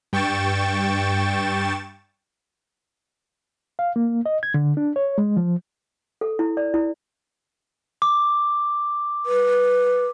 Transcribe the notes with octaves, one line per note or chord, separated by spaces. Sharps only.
G2 G5 C#6 A6 E7
F5
A#3
D#5
G#6
D3
D4
C#5
G#3
F3
A4
E4
D5
E4
D6
B4